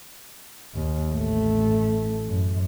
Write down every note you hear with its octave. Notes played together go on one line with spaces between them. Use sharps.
D#2
A1 A3
F#2